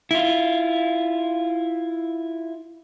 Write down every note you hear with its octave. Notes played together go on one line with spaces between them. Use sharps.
E4 F4